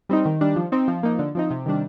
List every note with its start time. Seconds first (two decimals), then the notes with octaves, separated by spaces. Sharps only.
0.09 G3 C4 D#4
0.25 D#3
0.41 G3 D4
0.56 F3
0.72 C4 D#4
0.88 F3
1.03 A#3 D#4
1.19 D3
1.35 F3 C4 D#4
1.51 C3
1.66 D#3 G3 D4